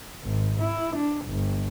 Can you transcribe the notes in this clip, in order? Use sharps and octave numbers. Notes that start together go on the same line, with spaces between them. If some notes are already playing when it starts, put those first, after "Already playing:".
G#1
E4
D4
G1